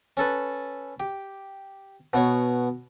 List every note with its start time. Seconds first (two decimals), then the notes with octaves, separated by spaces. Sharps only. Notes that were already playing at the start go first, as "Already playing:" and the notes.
0.17 C#4 A4 B4
1.00 G4
2.13 B2 B3 C#5